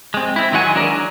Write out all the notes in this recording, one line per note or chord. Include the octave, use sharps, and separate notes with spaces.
G#3 C4
C4 E4
D#3 F#3 G#3 F#5 G#5
E3 D4 G#4 A#4
F#3